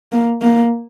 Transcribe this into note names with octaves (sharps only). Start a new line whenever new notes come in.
A#3
A#3